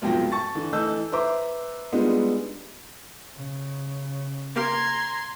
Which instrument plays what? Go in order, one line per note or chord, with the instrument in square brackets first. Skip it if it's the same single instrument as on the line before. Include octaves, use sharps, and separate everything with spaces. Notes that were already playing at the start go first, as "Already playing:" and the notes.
[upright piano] F1 B1 G#2 F3 G5 A#6
A5 C#6 A6
D3 E3
E3 A3 D#5 A5 E6 G6
B4 C5 E5 A#5 D6
G3 G#3 B3 D4 D#4 F4
[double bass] C#3
[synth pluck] A#3 G4 F5 [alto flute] A#5 [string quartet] C6 G#6